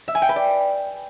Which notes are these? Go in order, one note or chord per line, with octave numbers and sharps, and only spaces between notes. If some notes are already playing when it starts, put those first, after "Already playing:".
E5
G#5
G5
B4
D5